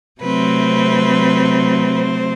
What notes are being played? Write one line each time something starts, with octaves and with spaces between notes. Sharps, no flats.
C3 F#3 A3 C4 B4
C5